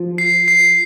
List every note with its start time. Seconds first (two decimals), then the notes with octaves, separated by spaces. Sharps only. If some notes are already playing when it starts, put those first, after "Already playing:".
Already playing: F3
0.18 C7
0.48 C7